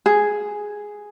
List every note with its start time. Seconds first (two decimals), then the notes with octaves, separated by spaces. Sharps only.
0.06 G#4